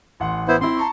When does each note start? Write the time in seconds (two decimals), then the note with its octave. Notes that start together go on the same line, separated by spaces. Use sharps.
0.20 A1 F#5 C6
0.48 B3 E4 C5
0.61 C4 E4 C6
0.77 A5 A#5 C#6